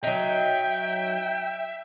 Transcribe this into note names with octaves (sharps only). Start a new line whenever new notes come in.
F#3 D#4 E5 G5